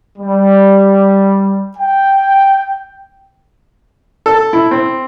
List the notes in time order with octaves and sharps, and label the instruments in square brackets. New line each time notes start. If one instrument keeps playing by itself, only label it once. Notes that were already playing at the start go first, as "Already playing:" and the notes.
[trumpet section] G3
G5
[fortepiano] A4
E4
C4